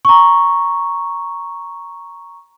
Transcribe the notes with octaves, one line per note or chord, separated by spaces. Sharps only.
A#5 C#6